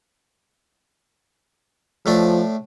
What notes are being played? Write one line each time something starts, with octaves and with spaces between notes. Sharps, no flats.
A2 F3 A3 D4